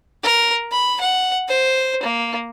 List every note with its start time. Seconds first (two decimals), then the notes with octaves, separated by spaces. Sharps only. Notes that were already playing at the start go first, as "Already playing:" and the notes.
0.23 A#4
0.72 B5
1.01 F#5
1.48 C5
2.03 A#3